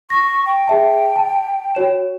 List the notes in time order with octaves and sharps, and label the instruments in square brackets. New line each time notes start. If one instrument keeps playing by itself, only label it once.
[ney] C#6 [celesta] A#6
[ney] G5
[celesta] G#4 E5 A5
A5
F#4 C#5 E7